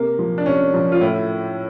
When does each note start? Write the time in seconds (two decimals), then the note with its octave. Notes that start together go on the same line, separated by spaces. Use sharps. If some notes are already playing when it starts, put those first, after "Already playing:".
Already playing: C3 A#3
0.19 F3
0.38 D4
0.46 C3 C#4
0.74 F3
0.92 F4
1.01 A2 E4